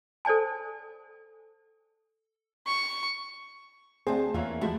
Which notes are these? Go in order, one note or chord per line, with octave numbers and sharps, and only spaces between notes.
A4 C5 D5 G#5 A5
C#6
D2 C4 G#4 C5 G#5 A5
E2 E3 A#3 F4 C#5 E5
F3 G#3 A3 E4 F#4